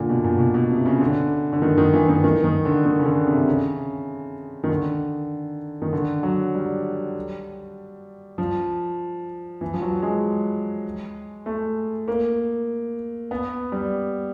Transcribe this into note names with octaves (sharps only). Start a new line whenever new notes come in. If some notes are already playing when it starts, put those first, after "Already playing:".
Already playing: A#2 D3
B2
A#2
B2
B2
C3
C#3
D3
D3
D#3
D#3
E3
D#3
D#3
D#3
D3
D#3
C#3
D3
C3
C3
C#3
D#3
D3
D#3
D3
F#3
G3
F3
E3
F3
F#3
G#3
A3
A#3
B3
G3